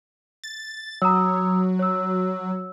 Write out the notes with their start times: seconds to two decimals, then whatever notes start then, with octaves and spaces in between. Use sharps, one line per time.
0.44 A6
1.02 F#3 A#5 D#6 E6
1.79 C#5 E6